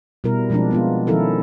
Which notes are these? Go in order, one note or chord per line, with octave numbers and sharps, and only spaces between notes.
B2 G3 E4 A#4
B2 F3 G#3 C4 D4
G#3 B3 F4
D#3 F3 C#4 E4 A4 A#4